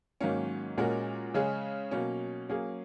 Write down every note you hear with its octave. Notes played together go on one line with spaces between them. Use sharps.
G#2 D#3 F#3 A#3 C#4
A#2 G#3 C#4 F#4 A#4
C#3 G#3 C#4 G#4
B2 F#3 A#3 C#4
F#3 A#3 C#4 G#4